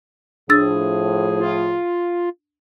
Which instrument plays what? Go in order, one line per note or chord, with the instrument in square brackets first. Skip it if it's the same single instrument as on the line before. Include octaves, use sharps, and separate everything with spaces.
[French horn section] A2 F3 [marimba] D4 E6 A6 [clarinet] G#4
[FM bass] F4